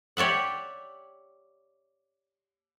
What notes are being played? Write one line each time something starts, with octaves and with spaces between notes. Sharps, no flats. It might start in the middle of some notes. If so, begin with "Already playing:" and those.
G4 C#5 D5 E5 F#5